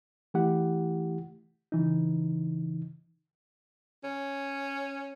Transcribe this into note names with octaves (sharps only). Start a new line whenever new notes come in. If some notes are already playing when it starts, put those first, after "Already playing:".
E3 A3 E4 G4 F#5
C#3 E3 D#4
C#4